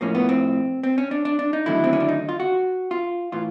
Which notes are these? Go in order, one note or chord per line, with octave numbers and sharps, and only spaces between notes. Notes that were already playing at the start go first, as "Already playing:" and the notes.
A2 F3 A#3 C#4
B3
C4
C4
C#4
D4
D4
D4
D#4
D#2 D3 F#3 A3 E4
C4
C#4
D4
D#4
F4
F#4
F4
A2 E3 F4